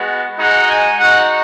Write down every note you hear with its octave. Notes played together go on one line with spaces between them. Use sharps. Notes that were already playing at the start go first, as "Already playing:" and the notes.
Already playing: G#3 B3 F#4
G#3 D#4 F#4 F#5
G#5
G#3 D#4 F#4 F#5